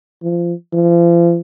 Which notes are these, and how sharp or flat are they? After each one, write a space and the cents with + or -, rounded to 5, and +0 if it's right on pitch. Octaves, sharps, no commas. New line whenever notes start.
F3 -20
F3 -40